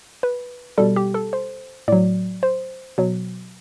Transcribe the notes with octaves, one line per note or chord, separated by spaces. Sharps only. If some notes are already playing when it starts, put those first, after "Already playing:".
B4
B2 G3 A4
G4
A4
C5
A2 F#3 D5
C5
B2 F#3